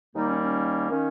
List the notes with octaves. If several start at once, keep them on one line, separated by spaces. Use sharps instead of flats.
D#2 D#3 G3 A#3 D#4
C#4
C#4
D#3 A#3 C#4